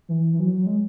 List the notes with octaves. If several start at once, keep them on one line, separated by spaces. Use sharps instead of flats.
E3
E3
F#3
F#3
G#3